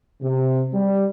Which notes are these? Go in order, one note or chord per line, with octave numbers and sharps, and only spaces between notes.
C3
G3